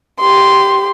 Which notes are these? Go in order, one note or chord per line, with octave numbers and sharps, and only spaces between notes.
G4 C6